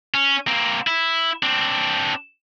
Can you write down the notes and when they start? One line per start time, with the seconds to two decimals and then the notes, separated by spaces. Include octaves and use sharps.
0.14 C#4
0.47 A#3 C4
0.87 E4
1.43 C4 D4